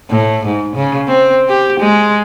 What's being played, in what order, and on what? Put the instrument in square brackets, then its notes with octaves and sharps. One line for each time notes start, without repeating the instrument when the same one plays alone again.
[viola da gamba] A2
G#2
C#3
C4
G4
G#3